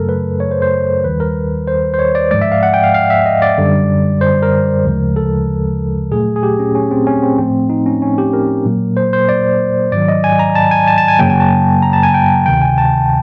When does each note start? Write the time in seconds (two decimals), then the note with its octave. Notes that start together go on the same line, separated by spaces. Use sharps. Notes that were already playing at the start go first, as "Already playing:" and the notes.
Already playing: F#2 C#3 F#3 A3 A4 A#4
0.09 B4
0.40 C#5
0.51 C5
0.62 C5
1.04 D#2 D#3 G3 B4
1.20 A#4
1.68 C5
1.94 C5
1.99 C#5
2.15 D5
2.31 G#2 F3 G#3 D5
2.41 E5
2.52 F5
2.63 F#5
2.74 G5
2.83 F5
2.94 F5
3.10 E5
3.26 D#5
3.42 D5
3.58 F#2 D3 G3
4.21 C5
4.43 A#4
4.85 D2 C#3 F3 G#3
5.16 A4
6.11 A#2 F#3 A3 G#4
6.36 G#4
6.43 G4
6.59 C#4
6.75 C#4
6.91 C4
7.07 C#4
7.22 C4
7.38 A2 F3 A3 C4
7.70 D#4
7.86 C#4
8.02 C#4
8.18 G4
8.33 A#4
8.65 A#2 F#3 A#3
8.97 C5
9.13 C5
9.29 D5
9.92 G#2 D#3 F#3 D5
10.08 D#5
10.24 G#5
10.39 A#5
10.55 A5
10.71 G#5
10.87 A5
10.98 A5
11.08 G#5
11.19 F#2 C#3 F#3 A#3 G5
11.30 G#5
11.40 A5
11.82 A#5
11.93 A5
12.03 G#5
12.14 G5
12.46 D2 C3 D#3 G5
12.62 G#5
12.78 A5